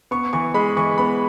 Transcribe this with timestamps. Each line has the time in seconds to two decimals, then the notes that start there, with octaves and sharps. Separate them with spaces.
0.11 B3 C#6
0.33 E3 C#6
0.54 G#3 B5
0.77 E3 C#6
0.98 B3 B5